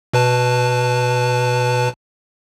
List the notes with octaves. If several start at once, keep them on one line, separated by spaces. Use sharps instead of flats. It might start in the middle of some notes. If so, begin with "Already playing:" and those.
B2 B4 A5